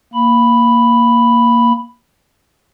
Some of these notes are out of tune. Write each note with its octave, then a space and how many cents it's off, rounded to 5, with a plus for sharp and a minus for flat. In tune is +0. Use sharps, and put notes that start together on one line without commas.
A#3 +0 B5 +0